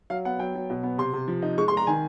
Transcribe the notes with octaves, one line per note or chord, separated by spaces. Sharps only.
F#3 F5
B3 F#5
F#3 G5
F#3
B2
B3
C3 C6
C3
F3
D#4
G#3 C#6
C6
G#3
A#5
D#3 G#5